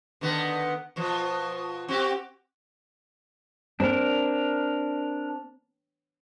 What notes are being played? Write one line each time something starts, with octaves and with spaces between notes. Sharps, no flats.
D3 D#3 B3
B2 F3
C4 F#4 G4
C4 D4 A#4